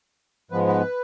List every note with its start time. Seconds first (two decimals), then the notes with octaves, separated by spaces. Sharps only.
0.51 G#2 F3 G#3 B3 B4
0.67 B4